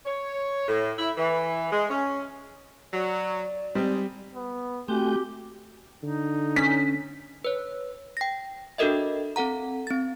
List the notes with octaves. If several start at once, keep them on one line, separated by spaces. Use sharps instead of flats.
C#5
A2
E4
E3
G#3
C#4
F#3 D5
G3 G#3 C4 D#4
B3
A3 C4 F#4 G4 G5 G#5 G6
D3 D#4
C#4 B6
B4 C#5
G5 A#6
D4 F#4 A4 A#4 D#5 E5
C4 A4 F#5 A#5
C4 A6